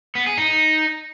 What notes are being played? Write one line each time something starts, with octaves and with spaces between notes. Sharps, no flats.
B3
G#4
D#4